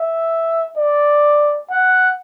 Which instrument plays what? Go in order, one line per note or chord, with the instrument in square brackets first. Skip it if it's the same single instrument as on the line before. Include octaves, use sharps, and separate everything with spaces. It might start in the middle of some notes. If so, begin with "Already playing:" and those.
Already playing: [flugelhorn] E5
D5
F#5